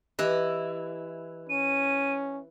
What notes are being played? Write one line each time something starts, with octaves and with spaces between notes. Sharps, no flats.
E3 E4 G4 D#5 F#6
C#4 D#7